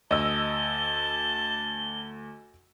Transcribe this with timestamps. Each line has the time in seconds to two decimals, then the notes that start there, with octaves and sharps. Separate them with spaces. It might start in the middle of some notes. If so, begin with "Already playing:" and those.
0.11 D2 D#5 A5 E6 G7